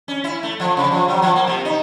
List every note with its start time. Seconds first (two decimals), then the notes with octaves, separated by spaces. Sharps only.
0.08 C#4
0.24 E4
0.43 A3
0.60 F3
0.77 C#3
0.92 F3
1.08 F#3
1.22 F3
1.36 A#3
1.47 C3
1.65 D#4